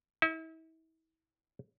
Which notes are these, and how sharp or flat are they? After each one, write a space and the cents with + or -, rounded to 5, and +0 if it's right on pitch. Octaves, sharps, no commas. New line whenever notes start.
E4 -40